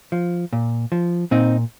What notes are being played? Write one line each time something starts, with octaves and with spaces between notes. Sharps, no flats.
F3
A#2
F3
A#2 C4 D#4